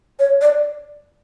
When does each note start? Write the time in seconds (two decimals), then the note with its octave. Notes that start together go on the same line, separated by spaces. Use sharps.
0.19 C#5
0.41 D5